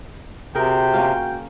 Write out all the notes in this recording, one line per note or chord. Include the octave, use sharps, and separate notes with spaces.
C3 F#4 G#4 A#4 G5
A#3 C#4 F4